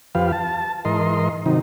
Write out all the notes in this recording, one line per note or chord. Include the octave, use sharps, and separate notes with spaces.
F2 F3 G4 B4 F5
A5
G#2 E3 A#4 D#5 C6
C3 D#3 F#3 D#4